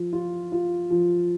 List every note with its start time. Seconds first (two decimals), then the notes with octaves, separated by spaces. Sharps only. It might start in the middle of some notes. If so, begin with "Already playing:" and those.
Already playing: F3
0.13 F4
0.52 F4
0.90 F3